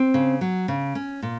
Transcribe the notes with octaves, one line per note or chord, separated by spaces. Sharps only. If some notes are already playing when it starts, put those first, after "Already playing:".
Already playing: C4
C#3
F#3
C#3
C#4
A#2